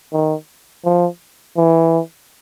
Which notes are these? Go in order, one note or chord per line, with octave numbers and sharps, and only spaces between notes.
D#3
F3
E3